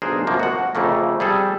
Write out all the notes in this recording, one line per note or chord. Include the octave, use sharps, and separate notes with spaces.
B1 D4 G#4 A#4 C5
F#2 B2 F3 A#3
F#4 F#5
F2 C#3 A3 A#3
G3 G#4 A4